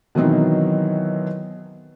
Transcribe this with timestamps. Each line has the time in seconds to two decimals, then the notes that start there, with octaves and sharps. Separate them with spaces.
0.15 B2 D#3 E3 F#3 C4 D#4